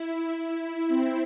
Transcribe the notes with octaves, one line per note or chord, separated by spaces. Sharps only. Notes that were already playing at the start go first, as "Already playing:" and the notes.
Already playing: E4
E4
C4